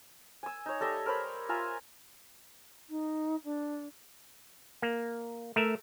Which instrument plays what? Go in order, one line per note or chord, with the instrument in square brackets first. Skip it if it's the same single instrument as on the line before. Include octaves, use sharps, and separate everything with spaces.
[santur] G#5 E6
D#4 C#5
G3 A4 D#5 E5
A#4 C5 C#5 B5
F4 E5 G#5 A#5
[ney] D#4
D4
[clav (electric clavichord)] A#3
A3 A#4 E5